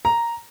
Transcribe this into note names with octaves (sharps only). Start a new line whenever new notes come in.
A#5